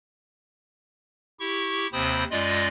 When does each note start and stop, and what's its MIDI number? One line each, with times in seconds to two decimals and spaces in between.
1.40 1.87 64
1.40 1.87 67
1.40 1.87 85
1.92 2.24 39
1.92 2.24 48
1.92 2.24 60
1.92 2.24 72
1.92 2.24 83
1.92 2.24 87
2.31 2.68 42
2.31 2.68 56
2.31 2.68 65
2.31 2.68 74
2.31 2.68 75